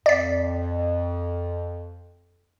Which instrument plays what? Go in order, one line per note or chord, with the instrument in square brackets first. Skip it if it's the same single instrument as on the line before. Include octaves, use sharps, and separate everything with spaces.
[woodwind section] F2 [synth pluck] D5 B6